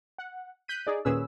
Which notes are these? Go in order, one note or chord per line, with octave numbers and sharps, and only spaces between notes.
F#5
F#6 G6 B6 D#7
D#4 G#4 D5
D#2 A#2 C#4 G#4 B4 E6